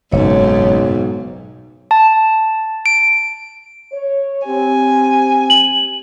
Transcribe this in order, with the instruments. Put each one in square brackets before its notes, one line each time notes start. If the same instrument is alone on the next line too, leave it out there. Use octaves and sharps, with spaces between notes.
[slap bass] F#1 [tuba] B1 [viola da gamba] G#2 [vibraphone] C#5
[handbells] A5
D7
[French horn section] C#5
[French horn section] C4 G4 [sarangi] G#5
[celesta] F#7